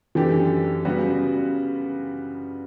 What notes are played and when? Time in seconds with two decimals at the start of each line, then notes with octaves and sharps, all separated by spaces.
0.15 F#2 E3 A3 D4 G4
0.85 C#3 G3 B3 F#4